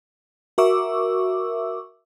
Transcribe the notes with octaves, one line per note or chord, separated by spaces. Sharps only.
F#4 A#4 E5 C#6 D6 E6